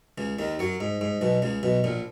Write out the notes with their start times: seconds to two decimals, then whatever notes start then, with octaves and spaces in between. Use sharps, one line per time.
0.18 C#2 C#3
0.39 D#2 D#3
0.59 F#2 F#3
0.80 G#2
1.01 G#2
1.21 B1 B2
1.42 C#2 C#3
1.63 B1 B2
1.84 A#1 A#2